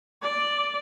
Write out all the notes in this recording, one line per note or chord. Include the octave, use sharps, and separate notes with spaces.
D5